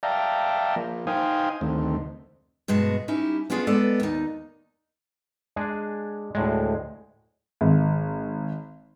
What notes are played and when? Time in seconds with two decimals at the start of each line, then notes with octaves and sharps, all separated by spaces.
0.03 D5 E5 F5 G5 A5 A#5
0.76 F3 A#3
1.07 D#4 C5 F5 G5 G#5 D#6
1.61 D2 D#3 A3 C4
2.68 G2 B2 G#3 F#4 A5
3.08 G3 C#4 D#4 E4 G4
3.50 B3 C#4 D4 F4 G#4
3.67 G#3 B3 A4 D5
4.00 D#2 D#4
5.56 G#3 D4 G#4
6.35 D2 A2 G#3
7.61 G#1